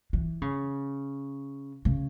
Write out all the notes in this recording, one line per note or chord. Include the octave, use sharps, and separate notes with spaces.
E3
C#3
C#3